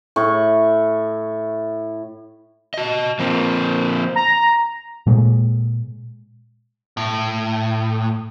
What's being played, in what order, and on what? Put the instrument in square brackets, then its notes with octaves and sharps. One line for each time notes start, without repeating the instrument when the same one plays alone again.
[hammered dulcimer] A2 C#6
[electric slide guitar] F#4 D#5
F3 A#3 C4
[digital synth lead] A#5
[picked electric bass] A#2 G#3
[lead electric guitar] A2